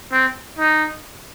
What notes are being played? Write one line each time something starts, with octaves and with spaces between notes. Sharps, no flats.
C4
D#4